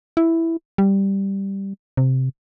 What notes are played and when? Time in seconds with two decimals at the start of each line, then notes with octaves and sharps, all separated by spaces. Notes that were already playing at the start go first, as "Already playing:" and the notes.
0.17 E4
0.78 G3
1.97 C3